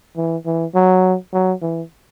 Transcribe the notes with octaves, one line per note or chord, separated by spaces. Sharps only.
E3
E3
F#3
F#3
E3